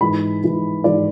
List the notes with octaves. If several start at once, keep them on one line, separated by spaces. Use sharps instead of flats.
G#2 E3 G#3 B5
G#2 E3 G#3
G#2 E3 G#3 D5